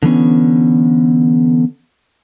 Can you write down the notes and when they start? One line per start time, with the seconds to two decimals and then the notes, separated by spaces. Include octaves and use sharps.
0.03 D3 E3 B3 C#4